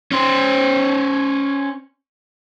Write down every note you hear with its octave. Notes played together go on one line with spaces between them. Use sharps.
C#4 C5